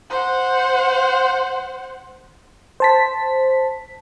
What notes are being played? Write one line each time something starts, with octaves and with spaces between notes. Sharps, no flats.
C5 F#5
C5 A5 B6